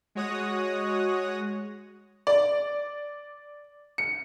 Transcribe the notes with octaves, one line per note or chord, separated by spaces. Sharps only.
G#3 F#4 C#5 D#6 F#6 A#6
D5
C#7